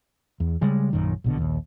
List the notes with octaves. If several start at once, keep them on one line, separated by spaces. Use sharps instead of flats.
E2
C#3 G3 G#3
A#1 F#2 D#3
A#1 B2 D3
A#1 D#2